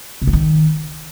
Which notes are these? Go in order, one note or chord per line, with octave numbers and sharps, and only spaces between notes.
C3
F3
D#3